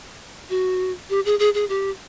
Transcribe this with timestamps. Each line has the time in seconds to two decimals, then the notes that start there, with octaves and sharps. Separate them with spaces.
0.50 F#4
1.10 G4
1.25 G#4
1.39 G#4
1.54 G#4
1.69 G4